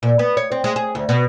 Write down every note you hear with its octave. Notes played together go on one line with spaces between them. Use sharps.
A#2
B3
C#5
C4
G#3
G#4
D2
B2